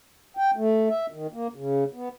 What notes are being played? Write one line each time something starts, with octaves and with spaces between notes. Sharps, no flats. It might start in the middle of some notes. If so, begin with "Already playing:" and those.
G5
A3
E5
D#3
A#3
C#3
B3